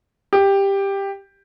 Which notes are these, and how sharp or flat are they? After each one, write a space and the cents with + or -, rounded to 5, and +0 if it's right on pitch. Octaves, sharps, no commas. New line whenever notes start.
G4 +10